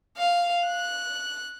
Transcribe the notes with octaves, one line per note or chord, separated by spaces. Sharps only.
F5
F#6